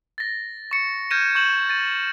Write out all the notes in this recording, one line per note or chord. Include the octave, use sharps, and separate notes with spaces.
A6 A#6
C#6 C#7
F6 G6 G#6 A#6 D#7 E7
C#6 G6 E7 F#7
A6 D#7